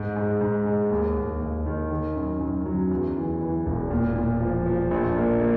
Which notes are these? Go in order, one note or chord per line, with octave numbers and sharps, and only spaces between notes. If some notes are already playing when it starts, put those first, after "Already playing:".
Already playing: G#2
G#2
G#2
G#3
D#2
D#2
D#2
D#3
D#3
F#2
F#2
F#3
E2
E3
E3
E1
A#2
A#2
F3
F3
A#1
A#3
A#3